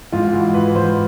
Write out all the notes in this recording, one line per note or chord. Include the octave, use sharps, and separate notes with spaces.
G#2 F4
E3 F#4
E3 B4
G#2 C5